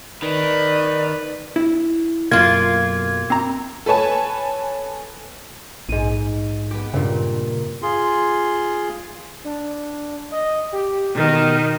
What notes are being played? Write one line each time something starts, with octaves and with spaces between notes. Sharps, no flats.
D#3 B4 D5
E4
B1 F#2 A#3 F4 G#6
C4 A#5
A4 B4 C#5 G#5 A5
A#1 G#2 D#7
B3 G4
G2 A#2 C#3
F4 G#4 C6
D4
D#5
G4
B2 D#3